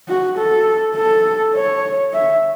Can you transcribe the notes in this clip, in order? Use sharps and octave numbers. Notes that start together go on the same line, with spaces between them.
F#4
A4
A4
C#5
E5